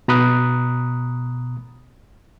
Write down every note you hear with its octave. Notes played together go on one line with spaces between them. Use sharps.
B2 A#5 B5 D#6 F#6